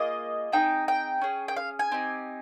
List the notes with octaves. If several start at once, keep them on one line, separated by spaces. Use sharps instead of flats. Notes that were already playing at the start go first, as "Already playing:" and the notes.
Already playing: A#3 F4 G#4 D#5
C4 D#4 G#4 G5
G5
C#4 G#4
G5
F5
G#5
C4 D#4 G4